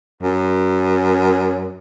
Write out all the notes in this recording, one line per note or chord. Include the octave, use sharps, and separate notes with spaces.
F#2